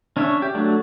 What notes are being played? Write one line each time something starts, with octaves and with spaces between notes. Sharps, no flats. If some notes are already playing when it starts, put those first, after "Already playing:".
C#4 D4 C#5 E5
G4
F#3 A3 D4